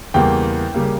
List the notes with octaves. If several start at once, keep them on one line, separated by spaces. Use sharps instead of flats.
E2 C#3 G3 A#3 G5
C#3 G3 A#3